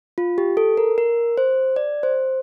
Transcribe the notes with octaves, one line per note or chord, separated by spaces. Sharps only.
F4
G4
A4
A#4
A#4
C5
D5
C5